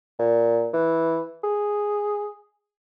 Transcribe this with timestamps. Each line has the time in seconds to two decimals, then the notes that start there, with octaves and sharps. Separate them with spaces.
0.19 A#2
0.73 E3
1.44 G#4